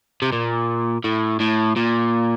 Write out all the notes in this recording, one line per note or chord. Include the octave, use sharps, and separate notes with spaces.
C3
A#2
A2
A2
A#2